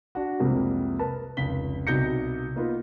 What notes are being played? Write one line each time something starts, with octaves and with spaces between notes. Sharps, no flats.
D4 F#4
C2 F2 C3 G3 G#3 A#3
A#4 B4 A5
F1 C#2 B6 G7
C2 B2 D#4 G6 A#6 C#7
A#3 B3 D#4 F4 B4